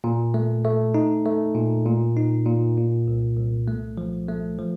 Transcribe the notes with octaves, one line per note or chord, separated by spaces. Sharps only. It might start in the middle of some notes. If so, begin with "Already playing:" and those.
A#2
A3
A3
D#4
A3
A#2
A#2
D#4
A#2
A#2
C2
C2
A3
F3
A3
F3